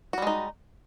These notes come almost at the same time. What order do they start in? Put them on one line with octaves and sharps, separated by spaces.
F#4 G3 G#3 D#4